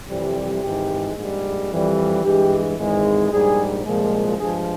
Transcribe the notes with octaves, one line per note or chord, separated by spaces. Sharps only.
F2 C3 E3 G3
G#1 G#2 E3 G#3 G4
A#1 G#2 G3
F2 E3 G3
G2 E3 G#3 G4
G#1 G#2 E3 G#3
A#1 G#2 G3 G#4
C2 A#2 F3 G#3
G2 F3 G#3 G#4